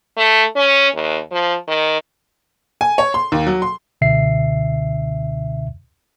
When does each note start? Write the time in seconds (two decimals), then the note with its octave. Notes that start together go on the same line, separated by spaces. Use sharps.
0.17 A3
0.56 C#4
0.95 D#2
1.32 F3
1.68 D#3
2.81 G#5
2.98 C#5
3.14 C6
3.32 D#2
3.47 F#3
3.62 C6
4.01 C#2 B2 D3 E5 C7